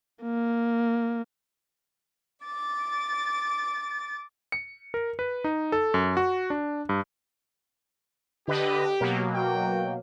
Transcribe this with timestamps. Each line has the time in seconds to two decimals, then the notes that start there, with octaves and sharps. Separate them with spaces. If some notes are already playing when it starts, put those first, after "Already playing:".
0.23 A#3
2.45 D6 A6
4.52 C#7
4.94 A#4
5.19 B4
5.44 D#4
5.72 A4
5.94 F#2
6.17 F#4
6.50 D4
6.89 G2
8.48 D3 G4 B4 D#5
9.00 B2 F#3 A#3
9.34 F#4 G5